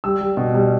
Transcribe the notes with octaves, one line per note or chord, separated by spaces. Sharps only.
G3 E6
G3
B2
G3